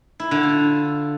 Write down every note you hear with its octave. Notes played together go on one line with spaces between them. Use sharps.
E4
D3
F4